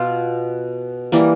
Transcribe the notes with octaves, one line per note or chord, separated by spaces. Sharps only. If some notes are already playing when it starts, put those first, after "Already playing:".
Already playing: B2 F4
E3 G3 A#3